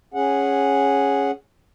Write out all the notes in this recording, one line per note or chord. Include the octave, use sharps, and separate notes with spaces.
C#4 G#4 F#5